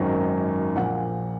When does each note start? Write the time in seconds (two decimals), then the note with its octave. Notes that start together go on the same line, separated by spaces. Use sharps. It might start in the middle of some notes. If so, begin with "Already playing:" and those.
Already playing: G#1 F#2 D#3
0.75 A#1 A#2 F3 F#5